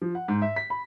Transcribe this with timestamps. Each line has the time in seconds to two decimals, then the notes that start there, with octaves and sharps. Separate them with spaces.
0.02 F3
0.15 F#5
0.28 G#2
0.42 E5
0.56 B6
0.70 B5